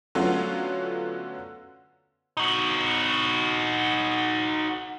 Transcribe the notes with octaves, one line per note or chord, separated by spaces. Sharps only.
D3 F#3 A3 B3 C#4 F4
D#4 F#4